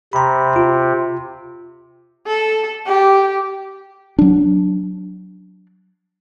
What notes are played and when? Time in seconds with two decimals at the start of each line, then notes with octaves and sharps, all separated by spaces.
0.13 C3 A#5 B5
0.56 F4
2.27 A4
2.86 G4
4.19 F#3 D4